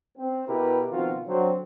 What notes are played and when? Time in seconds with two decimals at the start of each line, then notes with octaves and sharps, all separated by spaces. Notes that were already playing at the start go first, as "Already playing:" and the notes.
0.17 C4
0.48 B2 E4 G4 A#4 B4
0.91 B2 D#3 F3 C4 F4 F#4
1.27 D3 F#3 C4